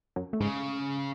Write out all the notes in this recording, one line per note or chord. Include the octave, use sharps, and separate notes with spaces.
F#2 F#3
A3
G#2 C#3 G#3